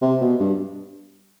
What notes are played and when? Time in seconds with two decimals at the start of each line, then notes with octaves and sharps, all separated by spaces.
0.02 C3
0.21 B2
0.40 G2